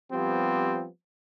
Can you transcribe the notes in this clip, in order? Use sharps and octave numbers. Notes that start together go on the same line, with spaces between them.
F3 G3 B3 C4 G4